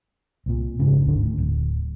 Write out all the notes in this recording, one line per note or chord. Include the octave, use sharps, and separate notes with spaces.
C2 A#2
F#1 G#2 C#3
D1 G1 D3
A2
D1